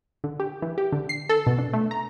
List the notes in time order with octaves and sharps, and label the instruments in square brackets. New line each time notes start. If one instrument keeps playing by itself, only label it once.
[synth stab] D3
G4
E3
G4
D3
C7
A4
B2
D4
A3
A#5